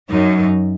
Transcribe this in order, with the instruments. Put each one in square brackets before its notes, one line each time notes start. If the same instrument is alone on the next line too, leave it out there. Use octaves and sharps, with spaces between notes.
[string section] F#2 [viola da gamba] D#4